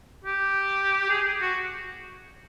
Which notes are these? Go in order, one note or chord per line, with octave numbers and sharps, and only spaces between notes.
G4
G#4
F#4